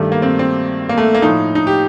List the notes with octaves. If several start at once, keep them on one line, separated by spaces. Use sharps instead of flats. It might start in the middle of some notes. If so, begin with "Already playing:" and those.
Already playing: G2 D#3 G3 A3
A#3
C4
C4
A#3
A3
A#3
A2 F3 D#4
D#4
G4